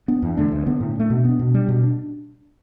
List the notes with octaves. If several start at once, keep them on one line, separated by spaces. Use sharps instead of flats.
B3 D4
E2
D3 A3 D4
D2
D3 B3 D4
A2
A3 D4
B2
B3 D4
B2
G3 D4
B2
D4